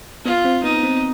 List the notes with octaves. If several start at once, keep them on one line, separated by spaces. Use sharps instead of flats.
B3 F4
C4
B3 D#4
C4